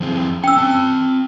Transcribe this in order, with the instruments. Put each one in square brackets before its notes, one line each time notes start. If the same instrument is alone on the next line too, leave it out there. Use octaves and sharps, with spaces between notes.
[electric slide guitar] F3 C4 G#4
[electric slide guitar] C#4 [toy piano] G5 E6
[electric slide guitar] C4 A5